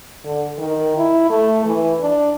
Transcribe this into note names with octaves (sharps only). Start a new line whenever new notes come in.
D3
D#3
E4
A3
E3
D4